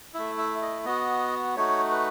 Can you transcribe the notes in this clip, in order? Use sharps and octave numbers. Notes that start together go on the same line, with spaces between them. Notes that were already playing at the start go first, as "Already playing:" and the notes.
A3 E4 E5
E5
D#5
B3 F#4 D#5
A3 D#4 F#4 C#5
B4